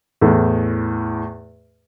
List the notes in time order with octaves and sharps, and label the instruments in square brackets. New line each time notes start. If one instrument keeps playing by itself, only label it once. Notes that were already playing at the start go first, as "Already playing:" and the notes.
[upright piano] E2 A2